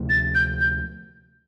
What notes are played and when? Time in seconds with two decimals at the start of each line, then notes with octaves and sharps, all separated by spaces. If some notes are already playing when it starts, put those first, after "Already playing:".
Already playing: D2 C3 F3 A3
0.09 A6
0.35 G6
0.60 G6